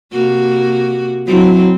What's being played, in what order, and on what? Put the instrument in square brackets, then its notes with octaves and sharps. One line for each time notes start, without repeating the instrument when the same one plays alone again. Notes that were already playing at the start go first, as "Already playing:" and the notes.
[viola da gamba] C3 A#3 F#4
[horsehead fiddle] F#3 E4 [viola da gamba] C4